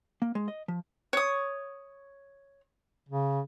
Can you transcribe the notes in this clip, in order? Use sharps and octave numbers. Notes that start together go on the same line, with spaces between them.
A#3
G#3
D#5
F3
C#5 D#6
C#3